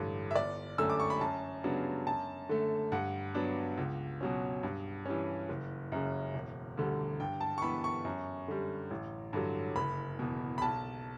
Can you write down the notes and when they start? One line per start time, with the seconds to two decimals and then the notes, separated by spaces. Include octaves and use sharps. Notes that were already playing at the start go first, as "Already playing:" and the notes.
Already playing: A1 G2 D3
0.31 E5
0.35 G1 D5
0.78 F#2 D3 A3 E6
0.90 D6
1.00 C#6
1.10 B5
1.21 F#2 A5
1.64 C#3 F#3 B3 D4
2.06 F#2 A5
2.49 D3 A3
2.92 G2 F#5
3.35 F#3 B3 D4
3.77 C#2
4.21 B2 F#3 C#4
4.63 G2
5.05 E3 G3 C#4
5.49 F#1
5.92 F#2 C#3
6.34 E1
6.77 D2 D3 G3
7.20 G2 G5
7.41 A5
7.58 C#6
7.62 E3 B3 B5
7.84 C#6
8.05 F#2
8.48 D3 G3
8.91 A1
9.33 G2 D3 F#3
9.76 F#1 B5
10.19 E2 B2
10.58 B5
10.61 B1 A5